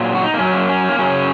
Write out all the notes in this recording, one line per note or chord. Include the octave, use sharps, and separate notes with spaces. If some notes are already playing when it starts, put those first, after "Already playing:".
Already playing: A#2 F#3
F#4
D#4
A#3
F#2 F#3 C#4
A#3
C#4
A#3
F#2 C#3 F#3 C#4